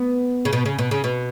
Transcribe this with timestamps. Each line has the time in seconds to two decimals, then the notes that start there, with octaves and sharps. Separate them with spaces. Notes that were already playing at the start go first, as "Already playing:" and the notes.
Already playing: B3
0.45 C#3
0.53 B2
0.65 C#3
0.79 B2
0.91 C#3
1.04 B2